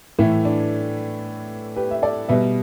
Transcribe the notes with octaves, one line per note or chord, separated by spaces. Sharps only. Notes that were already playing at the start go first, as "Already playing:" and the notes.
A2 E3 A3 E4
D4
G4 B4
E5
A4 D5
B2 G3 B4 E5